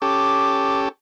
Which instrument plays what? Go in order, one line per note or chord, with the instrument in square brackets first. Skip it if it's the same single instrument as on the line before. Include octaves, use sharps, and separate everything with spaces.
[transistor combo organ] C#4 G4 A4 [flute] D6